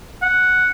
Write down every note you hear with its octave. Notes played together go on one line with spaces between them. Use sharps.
F#5